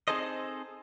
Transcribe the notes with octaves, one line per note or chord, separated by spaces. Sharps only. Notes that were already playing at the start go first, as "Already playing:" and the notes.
C4 D#4 G#4 A4 C5 D#5